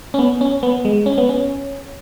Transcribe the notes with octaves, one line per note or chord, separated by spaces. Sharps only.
C#4
B3
C#4
B3
G#3
C#4
B3
C#4